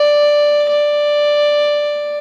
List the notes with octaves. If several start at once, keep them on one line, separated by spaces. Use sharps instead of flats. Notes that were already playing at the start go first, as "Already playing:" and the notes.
Already playing: D5
D5